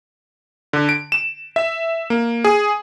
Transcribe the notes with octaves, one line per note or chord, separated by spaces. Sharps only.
D3
D7
E7
E5
A#3
G#4